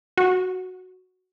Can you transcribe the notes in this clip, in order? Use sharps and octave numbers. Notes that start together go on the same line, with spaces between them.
F#4